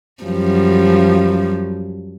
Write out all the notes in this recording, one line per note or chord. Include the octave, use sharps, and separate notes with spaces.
F#2 F3 G3